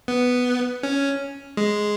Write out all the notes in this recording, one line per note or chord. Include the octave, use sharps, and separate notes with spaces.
B3
C#4
G#3